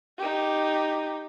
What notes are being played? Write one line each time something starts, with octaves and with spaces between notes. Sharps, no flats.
D#4 G4